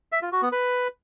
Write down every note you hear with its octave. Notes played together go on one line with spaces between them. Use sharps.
E5
F4
F#4
B3
B4